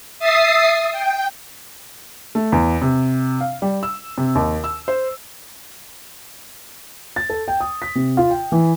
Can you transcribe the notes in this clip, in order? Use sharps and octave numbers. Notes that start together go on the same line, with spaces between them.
E5 D#6 A6 C7
G5
A3
E2
C3
F5
G3
E6
C3
D#2
E6
C5
A6
A4
G5
D#6
B6
C3
F4
G5
E3